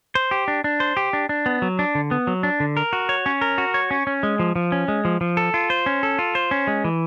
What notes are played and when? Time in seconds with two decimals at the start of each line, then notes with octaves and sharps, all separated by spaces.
0.15 C5
0.31 G4
0.48 D4
0.64 D4
0.80 C5
0.97 G4
1.13 D4
1.29 D4
1.46 B3
1.62 F#3
1.79 D4
1.95 D3
2.11 B3
2.27 F#3
2.43 D4
2.60 D3
2.77 A#4
2.93 F#4
3.09 C#5
3.26 C#4
3.41 A#4
3.58 F#4
3.74 C#5
3.91 C#4
4.07 C#4
4.23 G#3
4.39 F3
4.56 F3
4.72 C#4
4.88 G#3
5.05 F3
5.21 F3
5.37 A4
5.54 F4
5.70 C5
5.86 C#4
6.03 A4
6.19 F4
6.35 C5
6.51 C#4
6.67 G#3
6.84 E3